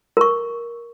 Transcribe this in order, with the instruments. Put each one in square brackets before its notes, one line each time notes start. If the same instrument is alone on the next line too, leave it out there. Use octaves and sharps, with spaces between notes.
[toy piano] A#4 C#6